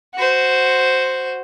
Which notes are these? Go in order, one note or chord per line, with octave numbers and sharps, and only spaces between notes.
F#4 C5